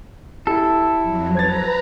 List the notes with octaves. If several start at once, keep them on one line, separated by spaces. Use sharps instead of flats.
E4 G4 A4
F2 F#3
B4 C5 A#5 G#6 A6